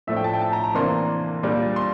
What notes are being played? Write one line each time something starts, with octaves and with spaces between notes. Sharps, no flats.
A2 F3 A3 D4 E5
G5
A5
G5
A5
A#5
A#5
C3 E3 A#3 D4 C6
A#2 G3 D4
C6